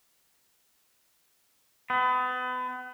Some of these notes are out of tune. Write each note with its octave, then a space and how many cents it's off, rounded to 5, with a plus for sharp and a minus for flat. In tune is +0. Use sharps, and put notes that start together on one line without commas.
B3 +35